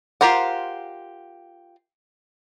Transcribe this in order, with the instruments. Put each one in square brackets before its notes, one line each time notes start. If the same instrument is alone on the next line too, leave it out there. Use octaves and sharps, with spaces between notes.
[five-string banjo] F4 G4 A#4 C5 F#5